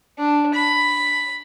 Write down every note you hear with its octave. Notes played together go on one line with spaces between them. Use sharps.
D4
B5